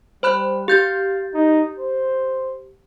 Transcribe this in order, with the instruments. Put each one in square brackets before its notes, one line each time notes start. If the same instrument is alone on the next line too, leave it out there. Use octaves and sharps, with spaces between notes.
[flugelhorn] G3 [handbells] C5 B5 F#6
[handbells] G4 G6 A6 [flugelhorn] F5
[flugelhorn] D#4
C5